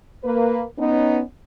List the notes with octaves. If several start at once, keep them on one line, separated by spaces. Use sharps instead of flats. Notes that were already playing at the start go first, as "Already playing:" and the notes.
A#3 B4
B3 C#4 D#4